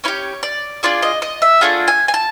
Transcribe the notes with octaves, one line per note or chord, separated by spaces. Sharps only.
C#4 E4 G4 C#5
D5
D4 F4 G#4 D5
D#5
D#5
E5
A3 D4 F4 G#4 F#5
G#5
G#5
A5